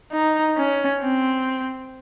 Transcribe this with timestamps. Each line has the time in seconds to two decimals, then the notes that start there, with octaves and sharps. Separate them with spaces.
0.12 D#4
0.57 C#4
1.01 C4